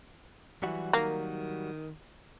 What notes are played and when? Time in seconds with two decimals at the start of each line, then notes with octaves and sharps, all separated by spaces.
0.63 E3 F#3 G3 F#4
0.93 D#3 A#3